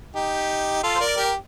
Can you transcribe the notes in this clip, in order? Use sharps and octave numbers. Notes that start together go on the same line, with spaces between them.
D#4 G4
F4 A4
C5
A#4 D5
G4 A#4